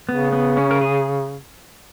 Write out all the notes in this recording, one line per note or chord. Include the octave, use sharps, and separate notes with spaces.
C#3 B3
B3
C#4
A#4
G#4